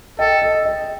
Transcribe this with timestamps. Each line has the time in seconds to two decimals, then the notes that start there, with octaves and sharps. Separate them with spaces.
0.19 A4 D#5 G5
0.42 D#5
0.65 D#5